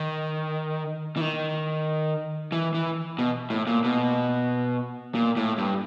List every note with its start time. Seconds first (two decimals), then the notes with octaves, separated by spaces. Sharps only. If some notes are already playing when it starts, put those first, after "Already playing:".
Already playing: D#3
1.17 E3
1.21 D#3
2.52 E3
2.74 E3
3.19 B2
3.50 A2
3.67 A#2
3.84 B2
5.15 A#2
5.36 A2
5.58 G2